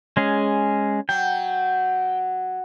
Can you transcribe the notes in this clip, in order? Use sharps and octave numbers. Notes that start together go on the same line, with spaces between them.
G#3 C#4 G#4
F#3 G5